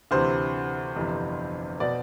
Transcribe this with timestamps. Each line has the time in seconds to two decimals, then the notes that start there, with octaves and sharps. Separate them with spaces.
0.11 D2 C3 E3 C5
0.96 G1 F2 C3 E3
1.80 B2 D5